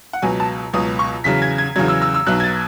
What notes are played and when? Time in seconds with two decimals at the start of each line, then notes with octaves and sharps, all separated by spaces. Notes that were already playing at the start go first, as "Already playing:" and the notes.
0.13 F#5
0.22 C#2 B2 F#3 G#5
0.40 A5
0.73 C#2 B2 F#3 D#6
0.99 C#6
1.24 E2 C#3 F#3 B6
1.42 G#6
1.58 G#6
1.76 E2 C#3 F#3 G#6
1.88 E6
2.02 E6
2.14 E6
2.27 B1 B2 F#3 F#6
2.40 G#6
2.44 A6